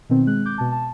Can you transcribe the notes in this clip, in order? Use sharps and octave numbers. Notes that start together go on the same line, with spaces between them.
B2 D#3 C4
G#3 F#6
D6 G6
B2 A5
A5